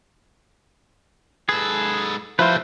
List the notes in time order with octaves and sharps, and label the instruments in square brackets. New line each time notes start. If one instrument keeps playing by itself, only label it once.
[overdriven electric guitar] G#2 B4 [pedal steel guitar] G#4 A4
[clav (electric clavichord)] F3 E4 F4 [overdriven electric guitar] G3 A3 [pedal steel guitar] B4 C5